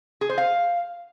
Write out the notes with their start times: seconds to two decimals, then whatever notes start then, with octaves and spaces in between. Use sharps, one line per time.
0.21 G#4
0.29 C5
0.38 F5